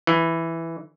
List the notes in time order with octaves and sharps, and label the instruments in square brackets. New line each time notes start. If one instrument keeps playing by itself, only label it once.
[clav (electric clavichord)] E3